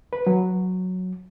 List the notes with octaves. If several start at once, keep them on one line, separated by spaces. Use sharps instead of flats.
B4
F#3